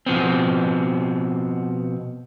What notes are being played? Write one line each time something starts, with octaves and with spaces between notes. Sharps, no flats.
B2 F3 B3 C4